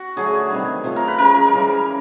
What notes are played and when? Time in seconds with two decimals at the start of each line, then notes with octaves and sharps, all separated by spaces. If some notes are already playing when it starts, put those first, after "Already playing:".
Already playing: F#4
0.16 D3 F#3 A3 G#4
0.50 C3 D#3 G3
0.84 C3 F3 A3
0.96 A#4
1.08 B4
1.18 C#3 F3 G#3 A#4
1.52 C#3 E3 G3